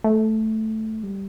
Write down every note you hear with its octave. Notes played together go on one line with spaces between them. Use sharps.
A3
G3